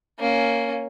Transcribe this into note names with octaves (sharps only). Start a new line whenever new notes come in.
A#3 C#4